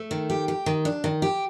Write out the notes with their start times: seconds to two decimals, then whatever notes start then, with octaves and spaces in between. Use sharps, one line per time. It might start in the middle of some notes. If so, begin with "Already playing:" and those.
Already playing: A3
0.11 D#3
0.30 G4
0.48 G4
0.66 D#3
0.85 D4
1.04 D#3
1.22 G4